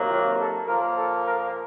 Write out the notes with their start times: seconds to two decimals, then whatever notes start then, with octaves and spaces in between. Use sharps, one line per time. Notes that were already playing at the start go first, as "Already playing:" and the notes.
Already playing: C3 D#3 F#3 A#3
0.08 F4
0.37 A4
0.66 A#2 F3 A#3 A#4
0.95 A4
1.24 A#4